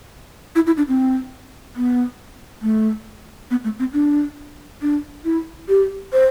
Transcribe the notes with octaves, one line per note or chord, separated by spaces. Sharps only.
E4
E4
D4
C4
B3
A3
B3
A3
C4
D4
D4
E4
G4
C5